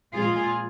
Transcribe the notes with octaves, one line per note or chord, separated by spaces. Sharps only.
A#2 F3 G#3 C4 F4 G#4